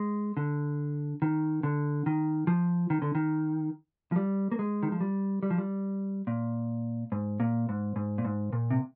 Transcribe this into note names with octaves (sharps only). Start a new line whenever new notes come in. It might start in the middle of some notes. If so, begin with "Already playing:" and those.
Already playing: G#3
D3
D#3
D3
D#3
F3
D#3
D3
D#3
F3
G3
A#3
G#3
D#3
F3
G3
G3
F3
G3
A#2
G#2
A#2
G#2
G#2
A#2
G#2
A#2
C3